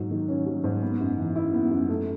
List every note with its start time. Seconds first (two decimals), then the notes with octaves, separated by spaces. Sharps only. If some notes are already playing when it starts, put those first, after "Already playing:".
Already playing: G#2 F#3
0.11 D#3
0.28 C#4
0.46 F#3
0.64 G#2
0.82 B3
1.00 F#2
1.18 E3
1.36 E4
1.54 B3
1.71 F#2
1.89 A3